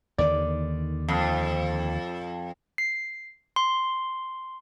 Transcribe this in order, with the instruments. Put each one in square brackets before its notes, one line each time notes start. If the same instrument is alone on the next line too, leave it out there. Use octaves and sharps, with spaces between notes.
[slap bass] D#2 D3 D#3 [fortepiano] D5
[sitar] F2
[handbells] C7
C6